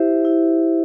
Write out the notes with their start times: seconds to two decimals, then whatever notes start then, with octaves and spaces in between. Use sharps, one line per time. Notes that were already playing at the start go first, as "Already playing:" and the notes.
Already playing: E4 G4 C5 E5
0.25 E4